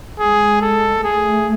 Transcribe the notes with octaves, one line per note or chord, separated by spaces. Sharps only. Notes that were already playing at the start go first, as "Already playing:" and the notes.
G#3 G#4
A4
A3 G#4